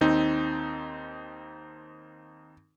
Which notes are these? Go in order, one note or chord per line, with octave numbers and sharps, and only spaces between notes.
D#2 C4 D#4